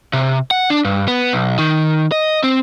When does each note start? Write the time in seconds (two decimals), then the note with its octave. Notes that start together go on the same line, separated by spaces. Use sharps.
0.13 C3
0.51 F#5
0.70 D4
0.85 G2
1.08 B3
1.33 B1
1.59 D#3
2.12 D#5
2.44 C4